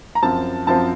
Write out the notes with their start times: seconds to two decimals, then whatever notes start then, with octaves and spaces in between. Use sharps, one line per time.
0.15 A#5
0.23 F#2 F3 C4 A5
0.67 F#2 F3 C4 A5